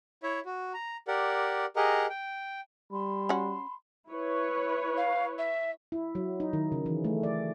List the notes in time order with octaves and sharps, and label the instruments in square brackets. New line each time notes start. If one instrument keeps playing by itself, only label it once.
[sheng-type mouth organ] E4 C#5 E5
F#4
A#5
G4 A#4 D5 F#5
G4 G#4 A#4 D#5 F#5 A#5
G5
[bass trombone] G3 [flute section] A5 B5 C6
[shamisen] C#4 F#4
[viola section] E4 B4 C#5
[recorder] F5
E5
[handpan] E4
F#3
D#4
D#3
C#3
E3
A3
D5